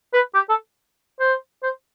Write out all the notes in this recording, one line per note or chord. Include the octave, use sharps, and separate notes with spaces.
B4
G4
A4
C5
C5